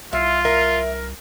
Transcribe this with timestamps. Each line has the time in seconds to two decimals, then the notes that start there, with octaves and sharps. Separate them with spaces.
0.13 C2 E4 F4
0.45 A#4 E5